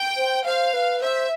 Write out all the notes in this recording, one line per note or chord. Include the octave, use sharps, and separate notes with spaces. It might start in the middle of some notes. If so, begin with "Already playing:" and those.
Already playing: G5
C5
C5 F5
B4
C5 E5